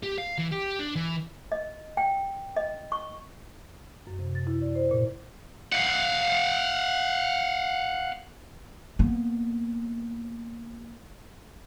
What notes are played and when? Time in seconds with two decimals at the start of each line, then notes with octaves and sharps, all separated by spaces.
0.03 G4
0.18 F5
0.38 E3
0.51 G4
0.79 D4
0.96 E3
1.52 D#5
1.97 G5
2.56 D#5
2.92 C#6
4.07 F#2
4.19 C3
4.35 A6
4.47 E4
4.62 D5
4.75 C5
4.91 A#2
5.73 F5 F#5
8.99 A#3 B3